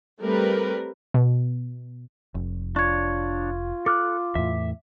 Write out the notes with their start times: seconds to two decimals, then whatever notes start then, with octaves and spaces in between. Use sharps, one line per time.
0.21 G3 A3 C4 A#4 B4
1.14 B2
2.35 F1
2.76 D4 F4 C#5 C#6 G#6
3.86 A4 D6 F6 F#6
4.35 E2 A2 E5